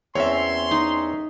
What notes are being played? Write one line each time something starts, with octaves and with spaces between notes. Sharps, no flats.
E2 C4 C#4 C#5 E5 C6
D#4